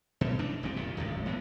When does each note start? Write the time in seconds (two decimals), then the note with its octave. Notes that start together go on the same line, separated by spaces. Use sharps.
0.21 B2
0.39 A1 E3 D4
0.63 F#1 A#2 G3 C4
0.76 F1 A#2 D#3
0.97 D1 G#1 C#2 A2
1.26 A2 E3 G#3 B3